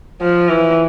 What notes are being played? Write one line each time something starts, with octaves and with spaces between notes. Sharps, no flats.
F3
E3